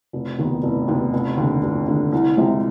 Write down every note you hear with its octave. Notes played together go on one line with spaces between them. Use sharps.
F1
D#2 D#3 B3
F1
D#2 D#3 B3
F1
D#2 D3
F1
D#2 D3
C2
C3 F3 G#3